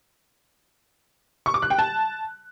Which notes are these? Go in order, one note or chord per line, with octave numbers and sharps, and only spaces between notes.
C#6
D6
F#6
G5
A5